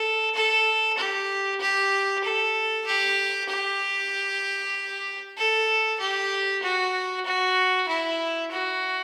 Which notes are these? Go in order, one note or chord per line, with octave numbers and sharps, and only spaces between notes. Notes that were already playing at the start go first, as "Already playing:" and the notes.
Already playing: A4
A4
G4
G4
A4
G4
G4
A4
G4
F#4
F#4
E4
F#4